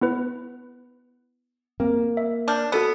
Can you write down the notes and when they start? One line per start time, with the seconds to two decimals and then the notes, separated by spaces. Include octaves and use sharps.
0.01 B3 E4 B4
1.80 A#3 C4
2.17 E5
2.48 D4 D6 F6 G6
2.72 B3 F#4 A4 F#6